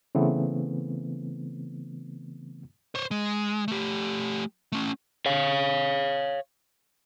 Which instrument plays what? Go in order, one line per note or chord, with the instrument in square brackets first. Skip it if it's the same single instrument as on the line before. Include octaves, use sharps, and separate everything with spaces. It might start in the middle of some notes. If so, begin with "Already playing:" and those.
[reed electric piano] C#3 E3 A3 B3 C4
[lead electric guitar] C5 C#5
G#3
A3 G4
A3 C#4
[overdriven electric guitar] C#5 F5